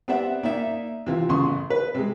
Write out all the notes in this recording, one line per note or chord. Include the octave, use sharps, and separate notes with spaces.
B3 C4 G4 D5 E5 F#5
A#3 D#4 D5 E5
C3 E3 F4
A1 C#3 C6 C#6
B4
C3 G#3